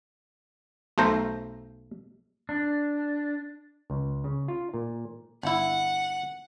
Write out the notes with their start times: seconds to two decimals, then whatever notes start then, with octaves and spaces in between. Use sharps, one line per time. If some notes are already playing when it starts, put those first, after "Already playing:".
0.98 B1 A3 C5 A#5
2.49 D4
3.90 C#2
4.24 C#3
4.48 F4
4.74 A#2
5.43 G1 E4 F#5